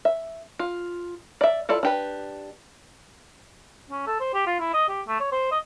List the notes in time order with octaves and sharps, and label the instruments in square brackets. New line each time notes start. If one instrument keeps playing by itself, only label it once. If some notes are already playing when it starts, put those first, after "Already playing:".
[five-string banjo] E5
F4
D5 E5
E4 F4 A4 D5
D4 G4 B4
[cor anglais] C#4
A4
C5
G4
F4
E4
D#5
G4
A3
C#5
C5
D#5